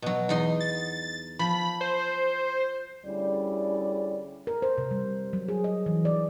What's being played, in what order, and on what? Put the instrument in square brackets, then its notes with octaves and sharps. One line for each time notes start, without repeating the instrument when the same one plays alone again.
[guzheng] B2 F#3
E2 D#4 C6
[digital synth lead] A6
[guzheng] F3 [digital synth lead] B5
[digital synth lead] C5
[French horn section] D2 G3 C#4 E4 G#4 D5
[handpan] A#4
C5
C3
G3
F#3
G#4
D#5
E3
D5